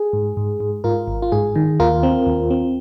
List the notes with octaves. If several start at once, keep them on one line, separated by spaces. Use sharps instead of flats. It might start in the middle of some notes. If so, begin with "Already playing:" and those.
Already playing: G#4
G#2
G#2
G#2
G#2 F4 A#4
G#1
F4
G#2 G#4
D#3
D#2 F4 A#4
C4
D#2
C4